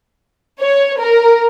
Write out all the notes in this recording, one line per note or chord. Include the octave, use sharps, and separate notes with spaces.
C#5
A#4